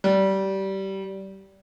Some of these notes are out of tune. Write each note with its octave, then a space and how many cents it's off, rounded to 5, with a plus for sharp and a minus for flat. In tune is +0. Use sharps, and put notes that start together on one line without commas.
G3 -20